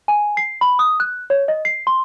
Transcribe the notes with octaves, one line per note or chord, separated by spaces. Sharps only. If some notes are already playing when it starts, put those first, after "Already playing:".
G#5
C7
B5
D#6
F#6
C#5
D#5
C7
C6